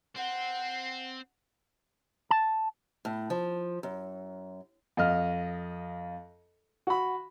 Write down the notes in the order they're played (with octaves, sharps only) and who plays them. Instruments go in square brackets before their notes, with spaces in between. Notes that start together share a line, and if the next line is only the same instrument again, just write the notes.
[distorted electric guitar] C4 [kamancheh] F#5
[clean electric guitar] A5
[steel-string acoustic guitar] A2
F3
F#2
[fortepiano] F2 D#5 F6
F#4 B5